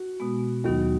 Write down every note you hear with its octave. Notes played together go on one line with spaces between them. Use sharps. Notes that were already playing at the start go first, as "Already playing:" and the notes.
Already playing: F#4
B2 G#3 B3
D#2 D#3 F#3 B3 D#4 F#4